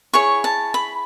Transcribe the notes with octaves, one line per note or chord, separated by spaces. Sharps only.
E4 G#4 C#5 C#6
A5
B5